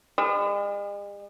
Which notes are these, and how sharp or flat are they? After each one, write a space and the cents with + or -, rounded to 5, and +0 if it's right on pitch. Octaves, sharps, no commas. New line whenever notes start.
G#3 -45